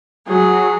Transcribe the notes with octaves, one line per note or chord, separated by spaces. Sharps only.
F#3 G#4